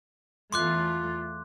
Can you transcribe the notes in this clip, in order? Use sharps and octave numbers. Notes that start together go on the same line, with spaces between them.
E2 A3 F4 C6 D6 F#6